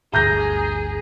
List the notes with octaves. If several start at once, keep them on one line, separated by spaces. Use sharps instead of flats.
G1 D2 G2 G#4 A#5 G6 A#6